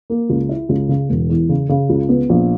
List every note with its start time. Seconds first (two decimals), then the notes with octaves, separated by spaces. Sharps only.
0.10 A#3
0.29 C#2
0.49 E4
0.69 C#2
0.89 C#3
1.09 E1
1.30 E2
1.49 C#3
1.69 C#3
1.89 C#2
2.09 B3
2.29 A#1